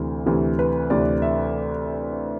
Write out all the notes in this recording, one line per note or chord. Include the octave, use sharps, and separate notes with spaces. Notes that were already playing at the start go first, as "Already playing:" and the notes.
Already playing: D2 C3 E3
D2 C3 E3
B4
D2 C3 E3 D5
E5